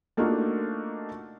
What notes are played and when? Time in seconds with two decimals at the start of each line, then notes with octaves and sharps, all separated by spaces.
0.17 A3 A#3 D4 D#4 F4 F#4